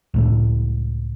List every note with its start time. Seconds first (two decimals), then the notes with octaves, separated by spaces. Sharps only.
0.14 C#2 A2 A3